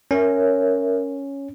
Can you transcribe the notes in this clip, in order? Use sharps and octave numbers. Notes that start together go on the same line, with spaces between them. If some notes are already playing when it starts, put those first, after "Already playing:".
C#4 A#4 C#5 E5